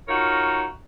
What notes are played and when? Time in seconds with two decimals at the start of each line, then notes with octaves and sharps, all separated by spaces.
0.08 D#4 F4 F#4 A#4 C#5